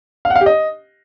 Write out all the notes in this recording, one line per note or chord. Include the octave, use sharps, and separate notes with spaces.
F5
F#5
F5
G4
D#5